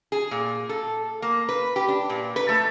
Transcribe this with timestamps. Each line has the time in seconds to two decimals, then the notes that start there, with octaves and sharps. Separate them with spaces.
0.12 G#4
0.31 A#2
0.69 A4
1.22 A#3
1.49 B4
1.76 G4
1.88 D4
2.10 A#2
2.36 B4
2.49 A3